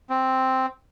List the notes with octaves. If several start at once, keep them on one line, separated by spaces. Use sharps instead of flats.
C4